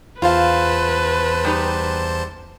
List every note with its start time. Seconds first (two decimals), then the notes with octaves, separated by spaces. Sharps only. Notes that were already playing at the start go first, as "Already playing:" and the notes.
0.22 E2 F4 B4 C5 F5 A5
1.45 G3 D#4 G4